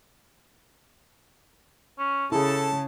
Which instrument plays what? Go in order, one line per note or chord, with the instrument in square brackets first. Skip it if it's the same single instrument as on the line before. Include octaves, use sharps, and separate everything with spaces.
[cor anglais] C#4
[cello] C#3 [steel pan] E4 G#4 [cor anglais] A4 [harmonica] A5